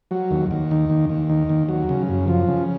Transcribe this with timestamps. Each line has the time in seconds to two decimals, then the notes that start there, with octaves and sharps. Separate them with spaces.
0.11 F#3
0.31 D#2
0.51 D#2
0.71 D#3
0.90 D#2
1.09 D#2
1.29 D#3
1.49 D#2
1.69 F#3
1.89 C#3
2.08 F#2
2.28 F3
2.48 C#3